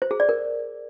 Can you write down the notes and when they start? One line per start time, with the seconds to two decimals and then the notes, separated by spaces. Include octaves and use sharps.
0.02 C5
0.11 G#4
0.20 D5
0.29 A#4